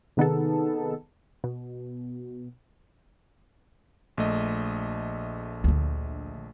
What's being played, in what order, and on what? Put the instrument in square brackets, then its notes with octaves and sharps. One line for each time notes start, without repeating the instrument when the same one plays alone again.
[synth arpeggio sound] C3 D#3 B3 D#4 G#4 A4
B2
[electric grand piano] A#1 A3 D#5
[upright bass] D2 D3